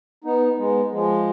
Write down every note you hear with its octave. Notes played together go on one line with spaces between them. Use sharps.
B3 D#4
G#3 B3
F3 G#3